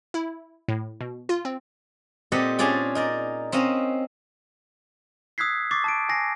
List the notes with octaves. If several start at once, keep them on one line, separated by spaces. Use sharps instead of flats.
E4
A2
B2
F4
C4
A#2 C4 G4 A4 D#5 F#5
C#4 D4 F4 G#4 D5 G5
D#4 A#4 D5
C4 C#4 D#5 F5
D#6 E6 F#6 G#6 B6 C7
C#6 D6 A6 C7
A5 D6 D7
G#5 A#6 C7